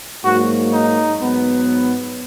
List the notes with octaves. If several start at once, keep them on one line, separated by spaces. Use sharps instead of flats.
G#2 F#3 A#3 F#4
D#4
G#2 F#3 B3